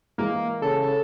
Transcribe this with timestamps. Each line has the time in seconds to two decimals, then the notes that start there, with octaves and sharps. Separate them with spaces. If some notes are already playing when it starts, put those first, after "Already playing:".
0.18 E3 G#3 A#3
0.62 C#3 A4